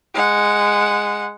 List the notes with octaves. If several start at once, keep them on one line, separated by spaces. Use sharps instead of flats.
G#3 F#5